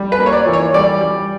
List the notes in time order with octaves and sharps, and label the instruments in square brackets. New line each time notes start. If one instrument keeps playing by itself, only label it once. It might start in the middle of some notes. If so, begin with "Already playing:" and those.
Already playing: [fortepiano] G3
B4
A#3
C#5
D5
E3
C#5
G3 D5
G3